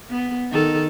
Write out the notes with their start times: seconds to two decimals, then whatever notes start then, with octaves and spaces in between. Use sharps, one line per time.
0.10 B3
0.51 D#3 A4